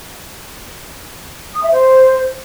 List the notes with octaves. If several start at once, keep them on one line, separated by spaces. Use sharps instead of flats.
D#6
E5
C5